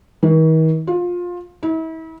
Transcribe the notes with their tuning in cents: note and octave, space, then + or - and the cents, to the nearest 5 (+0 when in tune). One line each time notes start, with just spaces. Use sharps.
D#3 +45
F4 +20
E4 -40